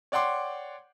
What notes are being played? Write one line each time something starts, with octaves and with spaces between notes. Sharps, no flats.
C#5 D5 F#5 G5 C6 D6